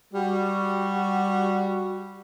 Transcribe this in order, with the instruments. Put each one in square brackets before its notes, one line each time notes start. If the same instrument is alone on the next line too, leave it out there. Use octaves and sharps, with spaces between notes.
[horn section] G3 F#4